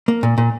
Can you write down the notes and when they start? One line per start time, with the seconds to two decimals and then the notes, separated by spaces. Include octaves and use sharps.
0.08 A#3
0.23 A#2
0.38 A#2